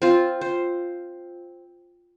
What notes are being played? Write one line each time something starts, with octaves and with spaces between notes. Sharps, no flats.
C4 F4
C5